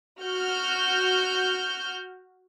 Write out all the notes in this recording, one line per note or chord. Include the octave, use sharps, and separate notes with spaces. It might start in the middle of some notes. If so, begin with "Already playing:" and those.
F#4 F6 G6